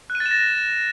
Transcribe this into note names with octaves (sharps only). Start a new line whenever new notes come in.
F#6
D#7
A6
E7
A#6